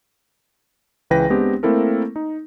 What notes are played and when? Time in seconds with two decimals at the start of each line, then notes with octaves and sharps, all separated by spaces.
1.10 C#2 C#3 E3 B4 G5 A#6
1.30 G#3 B3 C4 D4 G4
1.63 A3 A#3 C4 E4 A4 A#4
2.16 D#4